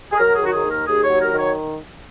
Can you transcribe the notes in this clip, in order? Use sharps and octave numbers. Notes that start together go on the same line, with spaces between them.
G#4
F#3 A#4
G#4
D#3
F#4
G#4
D#2
A#4
D#2 G#4
C#5
F#3
A#4
D#3
C#5